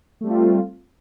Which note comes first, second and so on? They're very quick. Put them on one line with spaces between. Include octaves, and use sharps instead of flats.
A3 G3 C4 F4